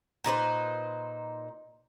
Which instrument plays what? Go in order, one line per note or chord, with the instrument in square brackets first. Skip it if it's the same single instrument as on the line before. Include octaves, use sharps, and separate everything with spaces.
[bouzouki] A#2 D#4 B4 C5